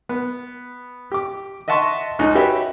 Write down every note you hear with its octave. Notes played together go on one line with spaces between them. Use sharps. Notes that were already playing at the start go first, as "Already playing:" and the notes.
B3
G4 D6
D#5 E5 F#5 A5 C6 C#6
C#2 C#3 D#4 F#6
F#4 G4 B4 C#5 E5